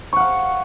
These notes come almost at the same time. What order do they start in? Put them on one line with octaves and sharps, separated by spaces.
C#6 F#5 F5